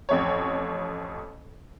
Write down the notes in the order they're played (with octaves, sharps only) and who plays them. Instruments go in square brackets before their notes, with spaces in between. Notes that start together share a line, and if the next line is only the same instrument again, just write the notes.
[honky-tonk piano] A1 F2 C#5